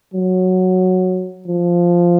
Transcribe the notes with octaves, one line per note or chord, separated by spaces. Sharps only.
F#3
F3